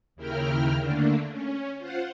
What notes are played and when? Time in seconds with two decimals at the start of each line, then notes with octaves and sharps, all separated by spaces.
0.16 D#2 C#3 E4 A#4 G5 F6
0.79 D3 A3 A#3 D4
1.28 C#4
1.79 F4 C5 F#5